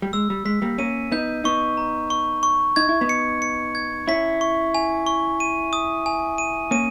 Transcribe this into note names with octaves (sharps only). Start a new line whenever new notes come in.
G3
G#3 E6
G3
G#3 B6
G3 A#3
A#3 C#4 D#7
B3 D#4 G6
B3 D#4 C#6
A#5
C#6
C#6
D#4 G#6
E4
B3 D#4
C#7
C#7
G#6
C#4 E4 B6
C#6
G#5
C#6
D#7
D#6
G#5
D#7
A#3 C#4 D#7